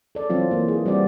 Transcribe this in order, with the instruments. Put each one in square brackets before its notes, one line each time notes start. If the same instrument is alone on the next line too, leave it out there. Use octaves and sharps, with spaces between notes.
[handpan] A4 D5
E3 F#3 C4 F4
E3 A#3
G#4
G3 C4 F#4 D5